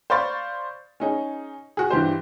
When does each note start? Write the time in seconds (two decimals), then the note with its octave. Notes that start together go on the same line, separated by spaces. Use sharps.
0.10 C5 D5 F5 B5 C#6 A6
1.00 C#4 D#4 G#4
1.77 F#4 G#4
1.91 G2 E3 G4 C5